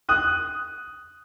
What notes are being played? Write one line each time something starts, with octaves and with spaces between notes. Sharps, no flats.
D#6 F#6 D#7